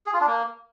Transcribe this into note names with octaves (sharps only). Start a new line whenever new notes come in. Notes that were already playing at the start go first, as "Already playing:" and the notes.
G#4
F4
D4
A#3